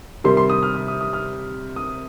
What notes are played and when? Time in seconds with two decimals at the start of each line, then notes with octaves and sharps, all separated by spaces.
0.24 C3 D#3 G3 C6
0.37 C6
0.50 D#6
0.63 F6
0.75 D#6
0.88 D#6
1.01 D#6
1.13 F6
1.76 D#6